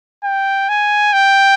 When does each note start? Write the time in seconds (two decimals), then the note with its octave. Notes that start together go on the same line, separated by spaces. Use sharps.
0.24 G5
0.69 G#5
1.13 G5